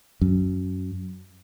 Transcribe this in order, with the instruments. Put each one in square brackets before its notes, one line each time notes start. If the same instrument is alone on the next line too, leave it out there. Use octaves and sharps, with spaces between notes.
[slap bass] F#2